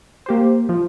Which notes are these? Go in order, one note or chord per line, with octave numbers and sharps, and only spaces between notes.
A#3 G4 C5
F3